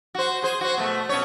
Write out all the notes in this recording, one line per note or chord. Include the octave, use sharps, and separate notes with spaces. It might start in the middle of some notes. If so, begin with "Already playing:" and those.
F#4 C5
G#4 C5
F#4 C5
B2 A3
B2 C#4 C#5